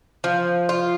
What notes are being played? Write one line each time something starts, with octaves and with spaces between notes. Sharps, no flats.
F3
F4